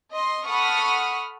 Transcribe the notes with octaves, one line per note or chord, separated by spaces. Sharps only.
D#5 C6
A4 F#5 B5 C#6 D#6 F6